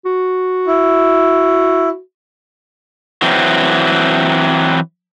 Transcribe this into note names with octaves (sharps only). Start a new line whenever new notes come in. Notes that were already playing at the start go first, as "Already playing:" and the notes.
F#4
E4
E3 F#3 C4